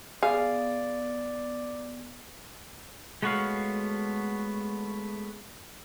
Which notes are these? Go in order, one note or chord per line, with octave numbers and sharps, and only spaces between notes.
B3 G#4 D5 F5
G#3 A3 B3 F#4 C#5 F5